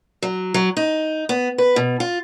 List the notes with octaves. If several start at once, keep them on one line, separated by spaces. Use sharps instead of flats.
F#3
F#3
D#4
B3
B4
B2
F4